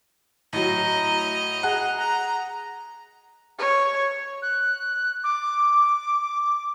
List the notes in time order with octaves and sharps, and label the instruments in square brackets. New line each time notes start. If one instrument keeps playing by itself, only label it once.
[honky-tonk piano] A2 F#3 [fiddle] D#5 A#5
[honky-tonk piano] G#4 F#5
[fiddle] A#5
[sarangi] C#5
[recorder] F#6
D6